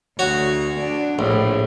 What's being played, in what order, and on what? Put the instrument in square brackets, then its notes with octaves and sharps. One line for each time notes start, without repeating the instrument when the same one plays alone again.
[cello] D2 [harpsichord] F#4 C#5
[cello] D4
[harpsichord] A#1 [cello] A2